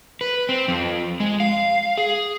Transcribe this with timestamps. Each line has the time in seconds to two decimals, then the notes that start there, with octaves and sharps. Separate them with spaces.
0.21 B4
0.49 C4
0.68 F2
1.20 G#3
1.40 F5
1.98 G#4